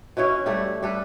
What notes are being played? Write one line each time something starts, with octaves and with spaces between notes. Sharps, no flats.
B2 C#4 E4 C#5
G3 A3 E4
G3 A4 B4